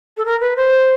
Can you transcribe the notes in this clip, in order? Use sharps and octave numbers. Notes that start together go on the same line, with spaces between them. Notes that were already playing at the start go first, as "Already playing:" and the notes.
A4
A#4
B4
C5